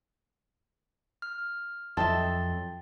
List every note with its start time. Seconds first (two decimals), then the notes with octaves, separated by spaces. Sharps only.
1.22 F6
1.97 F2 F#3 A4 D#5 E5 G5 C6 A6